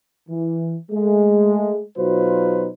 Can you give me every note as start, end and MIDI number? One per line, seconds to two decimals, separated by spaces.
0.29 0.76 52
0.91 1.82 56
0.91 1.82 57
1.97 2.68 47
1.97 2.68 54
1.97 2.68 63
1.97 2.68 65
1.97 2.68 71
1.97 2.68 72